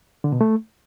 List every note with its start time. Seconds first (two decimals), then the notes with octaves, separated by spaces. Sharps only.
0.24 D3
0.32 B2
0.41 A3